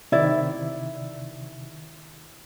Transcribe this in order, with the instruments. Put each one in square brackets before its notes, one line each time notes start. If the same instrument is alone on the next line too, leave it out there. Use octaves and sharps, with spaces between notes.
[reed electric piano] C3 D#3 [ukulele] E4 D5